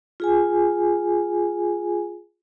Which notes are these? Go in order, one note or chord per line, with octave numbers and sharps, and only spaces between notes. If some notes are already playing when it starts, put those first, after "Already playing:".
F4 G#4 G#5